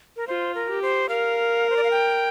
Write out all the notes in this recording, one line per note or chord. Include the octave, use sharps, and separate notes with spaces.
A#4
F4 C5
A#4
G4
C5
A#4 F5
C5
D5
F5
G5